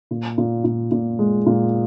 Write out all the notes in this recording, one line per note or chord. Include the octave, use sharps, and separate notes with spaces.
A#2
A#2
A#2
A#2
G#3
A#2